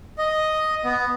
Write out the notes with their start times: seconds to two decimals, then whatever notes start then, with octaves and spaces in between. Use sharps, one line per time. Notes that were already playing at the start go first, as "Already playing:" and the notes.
0.19 D#5
0.84 B3